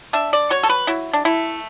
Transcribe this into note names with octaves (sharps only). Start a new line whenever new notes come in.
D4 E5
D5
F#3 C#5
A4
B4
F#3 E4
D4
A3 E4